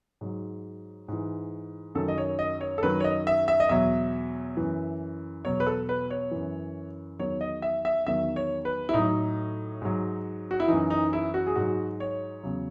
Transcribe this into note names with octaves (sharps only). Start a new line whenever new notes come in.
G#2 F#3
G#2 E3
F#2 D#3 F#3 A4
D#5
C#5
D#5
C#5
A4
F#2 D#3 F#3 B4
C#5
D#5
E5
E5
D#5
E2 B2 F#3 E5
F#2 E3
E2 B2 F#3 C#5
B4
A4
B4
C#5
F#2 E3
E2 D#3 F#3 C#5
D#5
E5
E5
E2 D#3 F#3 E5
C#5
B4
E4
A2 F#3 D#4
G#2 F#3
F#4
E4
F#2 E3 D#4
D#4
E4
F#4
G#4
G#2 F#3 F#4
C#5
E2 C#3 F#3